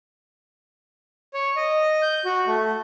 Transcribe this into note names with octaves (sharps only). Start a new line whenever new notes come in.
C#5
D#5
G6
F#4
A3